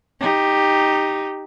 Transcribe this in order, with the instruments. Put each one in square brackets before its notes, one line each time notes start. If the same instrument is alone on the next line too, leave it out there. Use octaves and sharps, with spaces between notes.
[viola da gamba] D#4 G4